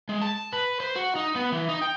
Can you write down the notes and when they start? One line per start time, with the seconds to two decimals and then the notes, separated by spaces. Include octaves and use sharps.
0.09 G#3
0.21 A5
0.53 B4
0.80 C5
0.96 F#4
1.16 D#4
1.35 B3
1.52 E3
1.69 D#4
1.82 G5